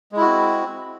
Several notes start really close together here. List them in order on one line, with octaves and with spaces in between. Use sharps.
G#3 E4 F#4 C4